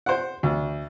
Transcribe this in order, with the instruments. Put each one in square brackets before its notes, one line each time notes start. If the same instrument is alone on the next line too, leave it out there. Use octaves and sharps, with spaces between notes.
[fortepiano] C5 F#5
D2